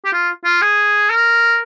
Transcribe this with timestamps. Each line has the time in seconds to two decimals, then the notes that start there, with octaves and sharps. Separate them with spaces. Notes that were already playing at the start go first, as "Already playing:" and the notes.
0.05 G4
0.13 F4
0.45 F4
0.62 G#4
1.10 A#4